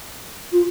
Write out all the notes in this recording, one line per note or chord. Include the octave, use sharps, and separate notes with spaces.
F4